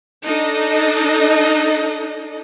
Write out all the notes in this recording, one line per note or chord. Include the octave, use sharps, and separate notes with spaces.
D4 D#4 A4 D#5